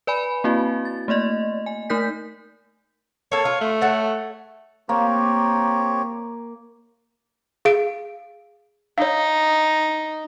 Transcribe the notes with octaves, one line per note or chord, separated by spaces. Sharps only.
B4 D5 G#5 B5
A#3 C4 E4 F#4
A6
A3 A#3 D5 D#5
G#5
A3 D#4 A#4 G6 B6
A#3 A4 C#5
F4
A3
A4 C#5 F#5
A#3 C4 G4 C#5
G#4 F5 D7
D#4 C#5 F5